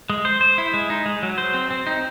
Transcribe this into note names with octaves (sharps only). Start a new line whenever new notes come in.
G#3
C5
C5
E4
G#3
D#4
G#3
F#3
C5
C4
C4
D#4